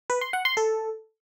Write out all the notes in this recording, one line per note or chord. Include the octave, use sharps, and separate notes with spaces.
B4
C6
F#5
C6
A4